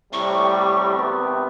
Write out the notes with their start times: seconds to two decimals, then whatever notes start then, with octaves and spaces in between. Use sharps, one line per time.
0.13 A2 C3 G3 C#6
0.96 G#1 C3 B3